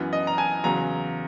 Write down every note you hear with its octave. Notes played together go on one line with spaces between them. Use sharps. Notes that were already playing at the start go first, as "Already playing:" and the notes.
Already playing: F#2 E3 B3
D#5
A#5
G#5
E2 C#3 F#3 A#5